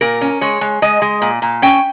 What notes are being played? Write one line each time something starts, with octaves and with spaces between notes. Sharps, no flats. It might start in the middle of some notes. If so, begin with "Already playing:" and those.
A#2 A#4
C#4
G#3 C#5
G#3
G#3 D#5
G#3
A#2
A#2
C#4 G5